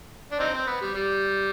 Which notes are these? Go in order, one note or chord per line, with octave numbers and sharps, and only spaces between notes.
D4
C4 D#4
C4
B3
G3
G3